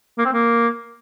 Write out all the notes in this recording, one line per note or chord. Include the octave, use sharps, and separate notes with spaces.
A#3
C4
A#3